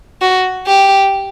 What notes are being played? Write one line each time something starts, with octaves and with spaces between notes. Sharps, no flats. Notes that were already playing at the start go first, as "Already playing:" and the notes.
F#4
G4